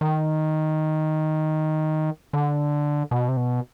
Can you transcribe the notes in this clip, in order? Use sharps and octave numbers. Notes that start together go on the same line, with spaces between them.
D#3
D3
B2
C3
B2